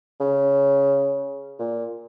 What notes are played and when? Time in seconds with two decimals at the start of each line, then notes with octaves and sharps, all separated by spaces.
0.20 C#3
1.59 A#2